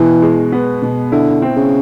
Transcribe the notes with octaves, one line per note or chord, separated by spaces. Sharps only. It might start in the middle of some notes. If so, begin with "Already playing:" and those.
Already playing: B2 E3 G#3
G#3
B3
B2
D3 E4
C4
C#3